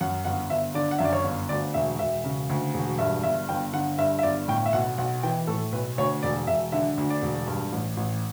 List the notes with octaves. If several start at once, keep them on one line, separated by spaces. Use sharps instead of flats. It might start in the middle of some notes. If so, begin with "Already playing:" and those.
F#2 F#5
G1 F#5
G1 E5
D3 D5
F#5
F#2 E5
D5
C#5
G1
D2 D5
E1 E5
E1 E5
C#3
D2
E1
G2 E5
G1 E5
G1 G5
D3 F#5
G2 E5
E5
G1 D5
A2 G5
E5
B1 F#5
B1 F#5
E3 G5
A2 A4
B1 B4
D2 C#5
E1 D5
E1 E5
D3 E5
D2
D5
E1
G2
A1
A1